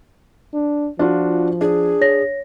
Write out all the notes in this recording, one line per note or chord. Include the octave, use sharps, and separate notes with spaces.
D4
F3 D4 F4 F#4
D4 G#4
C#5 A#6